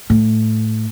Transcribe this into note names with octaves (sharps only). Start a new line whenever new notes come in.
A2